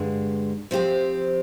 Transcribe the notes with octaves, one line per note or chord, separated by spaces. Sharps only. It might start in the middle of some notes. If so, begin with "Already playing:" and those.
Already playing: G2 D3 G#3
F3 C4 G4 C5